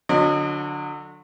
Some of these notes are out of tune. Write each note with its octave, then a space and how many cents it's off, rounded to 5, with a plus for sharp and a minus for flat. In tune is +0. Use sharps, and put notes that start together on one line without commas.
D3 +0 F#3 -30 D#5 -30